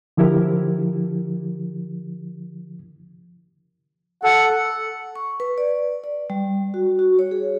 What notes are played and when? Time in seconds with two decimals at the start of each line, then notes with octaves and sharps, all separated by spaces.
0.17 D3 F3 E4 G4 A#4
4.23 A4 F#5
5.16 C#6
5.40 B4
5.58 D5
6.04 D5
6.30 G3
6.74 F#4
6.99 F#4
7.19 C#5
7.31 G#4